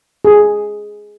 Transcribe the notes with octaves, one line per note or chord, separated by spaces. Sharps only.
G#4